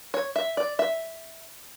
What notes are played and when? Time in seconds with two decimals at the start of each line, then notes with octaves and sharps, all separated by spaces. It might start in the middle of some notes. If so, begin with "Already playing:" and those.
0.14 C#5
0.36 E5
0.57 D5
0.79 E5